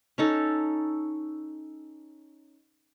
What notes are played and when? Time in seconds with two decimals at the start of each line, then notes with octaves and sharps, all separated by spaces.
0.18 C#4 D#4 A4